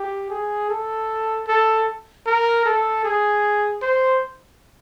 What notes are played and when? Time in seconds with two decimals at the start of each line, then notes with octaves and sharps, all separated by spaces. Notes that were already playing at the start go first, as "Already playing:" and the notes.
Already playing: G4
0.30 G#4
0.70 A4
1.47 A4
2.26 A#4
2.66 A4
3.04 G#4
3.82 C5